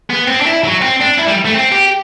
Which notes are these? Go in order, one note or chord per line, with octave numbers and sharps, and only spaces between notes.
B3
C4
D4
E4
F#3
C4
D4
E4
G3
A3
C4
G4